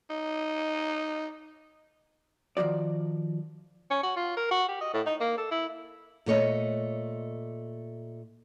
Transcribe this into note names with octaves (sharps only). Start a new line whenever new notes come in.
D#4
D#3 F3 F#3 F#4 D5
C#4
F#4
F4
A#4
F#4
G4
D#5
A2
D#4
A#3
A4
E4
A#2 A3 C#5 D#5